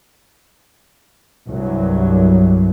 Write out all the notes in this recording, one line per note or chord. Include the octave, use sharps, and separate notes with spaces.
C2 G2 F#3